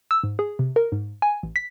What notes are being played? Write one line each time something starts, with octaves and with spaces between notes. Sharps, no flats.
E6
G#2
G#4
C3
A#4
G#2
G#5
A1
B6